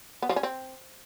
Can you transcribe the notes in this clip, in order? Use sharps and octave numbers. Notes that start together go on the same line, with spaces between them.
B3
F3
C#4
C4